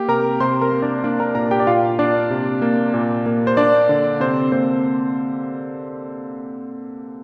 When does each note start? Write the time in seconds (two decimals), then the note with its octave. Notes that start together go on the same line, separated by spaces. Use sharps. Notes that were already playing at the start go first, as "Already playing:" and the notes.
Already playing: A#3 G4
0.08 C3 A#4 A#5
0.40 C3 C5 C6
0.61 A#4 A#5
0.72 A#3
0.82 D4 D5
1.04 A#3 D4 D5
1.20 A#4 A#5
1.35 A#2 A#4 A#5
1.51 G4 G5
1.60 D5
1.67 A#2 F4 F5
1.99 A#3 D4 D5
2.30 C3
2.62 A#3
2.94 A#2
3.26 A#3
3.47 C5
3.57 A#3 D4 D5
3.89 D3
4.20 C3 C4 C5
4.52 A#3 C4 C5